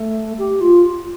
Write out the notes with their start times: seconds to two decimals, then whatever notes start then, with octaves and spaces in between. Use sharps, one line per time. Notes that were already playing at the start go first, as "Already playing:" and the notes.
Already playing: A3
0.39 G4
0.61 F4